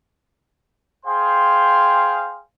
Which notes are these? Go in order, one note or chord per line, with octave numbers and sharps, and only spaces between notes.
G#4 C5 F5 G5 C6